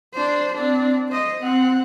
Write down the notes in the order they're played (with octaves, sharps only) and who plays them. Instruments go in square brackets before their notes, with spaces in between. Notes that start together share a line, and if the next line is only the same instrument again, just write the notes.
[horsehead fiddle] D4 C5
C4 D4
C5 D#5
C4 F#5